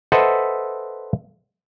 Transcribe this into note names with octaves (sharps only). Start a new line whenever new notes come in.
A4 B4 C5 D#5 E5 F#5